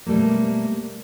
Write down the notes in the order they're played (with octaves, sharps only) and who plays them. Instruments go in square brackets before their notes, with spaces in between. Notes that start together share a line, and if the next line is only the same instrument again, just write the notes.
[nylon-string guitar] B2 G3 A3 A#3